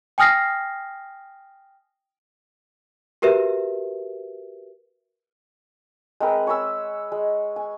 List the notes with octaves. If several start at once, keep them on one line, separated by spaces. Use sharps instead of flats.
G5 G#5 D#6 F6 A#6 C7
F#4 G4 A#4 B4 E5
G#3 C4 A#4 B4
C#5 G#5 B5 E6
G#3
G#5